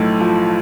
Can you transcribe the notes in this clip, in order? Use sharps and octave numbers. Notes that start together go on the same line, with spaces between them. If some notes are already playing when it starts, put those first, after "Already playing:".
Already playing: B1 A2 F3 A3
F3